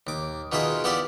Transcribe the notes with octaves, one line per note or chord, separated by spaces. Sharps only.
D#2 D6
B2 D#3 A#3 F4 G#4 E5
B3 E4 G4 D5 E5 F5